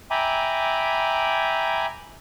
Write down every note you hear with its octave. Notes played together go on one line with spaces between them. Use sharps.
E5 G5 G#5 A#5 B5 D6